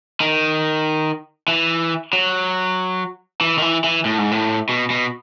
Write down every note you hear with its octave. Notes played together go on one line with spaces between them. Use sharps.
D#3
E3
F#3
E3
D#3
E3
E3
A2
G#2
A2
B2
B2